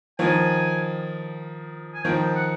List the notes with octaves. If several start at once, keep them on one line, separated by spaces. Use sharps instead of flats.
D#3 F3 G#5
G#5
D#3 F3 G5
F#5